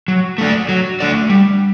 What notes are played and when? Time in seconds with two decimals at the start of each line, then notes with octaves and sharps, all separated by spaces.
0.08 F#3
0.38 A3 D4 A4 D5
0.69 F#3
1.00 A3 D4 A4 D5
1.30 G3